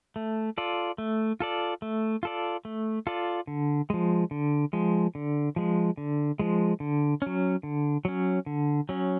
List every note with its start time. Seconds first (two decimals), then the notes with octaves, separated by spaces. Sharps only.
0.16 A3
0.58 F4 A4 D5
0.98 A3
1.40 F4 A4 D5
1.82 A3
2.23 F4 A4 D5
2.65 A3
3.07 F4 A4 D5
3.47 D3
3.90 F3 G#3
4.31 D3
4.73 F3 G#3
5.15 D3
5.56 F3 G#3
5.97 D3
6.39 F3 G#3
6.80 D3
7.22 F#3 C#4
7.63 D3
8.05 F#3 C#4
8.46 D3
8.89 F#3 C#4